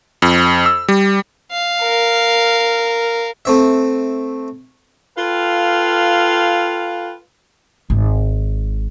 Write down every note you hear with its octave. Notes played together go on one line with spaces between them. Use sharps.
F2
E6
G3
F5
A#4
A3 C4 E5
F4 A4 B4 F5 G5
G#1 D#4